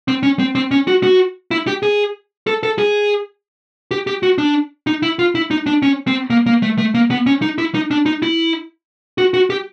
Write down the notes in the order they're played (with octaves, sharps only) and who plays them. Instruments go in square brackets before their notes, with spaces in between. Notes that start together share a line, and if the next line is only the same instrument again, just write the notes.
[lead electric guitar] C4
C#4
C4
C4
C#4
F#4
F#4
E4
G4
G#4
A4
A4
G#4
G4
G4
F#4
D4
D#4
E4
F4
E4
D#4
D4
C#4
C4
A#3
A#3
A3
A3
A#3
B3
C#4
D#4
E4
D#4
D4
D#4
E4
F#4
F#4
G4